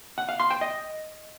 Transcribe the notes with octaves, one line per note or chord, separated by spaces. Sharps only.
F#5
F5
C6
G5
D#5